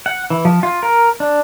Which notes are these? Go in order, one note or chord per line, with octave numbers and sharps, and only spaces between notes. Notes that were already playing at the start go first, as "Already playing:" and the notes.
F#5
E3
F3
F4
A#4
D4